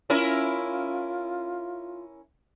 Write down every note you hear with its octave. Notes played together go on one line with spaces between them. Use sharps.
C#4 E4 F4 A#4